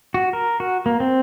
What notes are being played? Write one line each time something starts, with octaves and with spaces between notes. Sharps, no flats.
F#4
A#4
F#4
A#3
C4